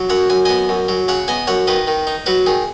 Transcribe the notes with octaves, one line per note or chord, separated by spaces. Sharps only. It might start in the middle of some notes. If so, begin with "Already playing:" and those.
Already playing: F#3
F#2 C#5 F#5
F#2 G#5
B3 D#5 G#5
F#2
F#3
C#3 C#5 F#5
B3 D#5 G#5
F#2 C#5 F#5
D#3 B4 D#5
D#3
D#4
F#3 F#4 B4
D#3 G#4